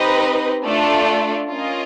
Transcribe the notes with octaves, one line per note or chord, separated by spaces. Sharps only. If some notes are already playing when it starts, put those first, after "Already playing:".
Already playing: C4 D#4 G4 B4 D#5
A3 D4 F4 A4 D5
C#4 F4 A#4 D#5